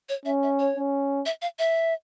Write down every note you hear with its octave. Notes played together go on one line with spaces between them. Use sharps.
C#5
C#4 E5
E5
C#5
C#4
E5
F5
E5